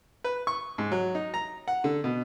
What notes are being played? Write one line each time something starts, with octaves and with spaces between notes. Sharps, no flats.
B4
C#6
G#2
F#3
D#4
A#5
F#5
D3
B2